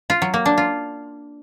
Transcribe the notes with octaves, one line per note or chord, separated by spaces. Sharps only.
F4
F#3
A#3
D4
F4